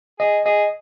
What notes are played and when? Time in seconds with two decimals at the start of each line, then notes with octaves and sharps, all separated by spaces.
0.20 G#4 D#5
0.45 G#4 D#5